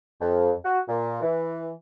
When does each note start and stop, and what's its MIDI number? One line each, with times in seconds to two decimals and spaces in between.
0.21 0.52 41
0.65 0.79 66
0.89 1.21 46
1.22 1.71 52